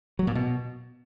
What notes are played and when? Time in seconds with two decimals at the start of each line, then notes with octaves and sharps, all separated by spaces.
0.19 F#3
0.27 A#2
0.35 B2